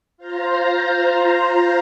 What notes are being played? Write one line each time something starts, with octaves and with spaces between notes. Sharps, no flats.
F4 C5 A#5